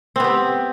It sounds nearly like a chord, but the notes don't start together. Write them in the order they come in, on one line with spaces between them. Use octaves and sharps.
C4 B3 G4